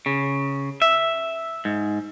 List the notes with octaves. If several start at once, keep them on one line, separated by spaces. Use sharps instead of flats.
C#3
E5
G#2